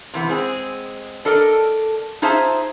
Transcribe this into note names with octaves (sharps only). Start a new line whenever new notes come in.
C3 E3 B3
G#3 C4 G#4
D4 A4 A#4 D#5
D#4 F4 G#4 C5 E5 A5